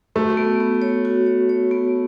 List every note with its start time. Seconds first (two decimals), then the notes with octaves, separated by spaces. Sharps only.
0.15 A3 F#4
0.37 B3
0.60 B3
0.82 C#5
1.05 F#4
1.26 C#5
1.49 C#5
1.71 B3